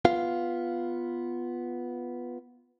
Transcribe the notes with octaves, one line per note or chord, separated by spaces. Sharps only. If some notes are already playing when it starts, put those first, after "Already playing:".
B3 F4 F5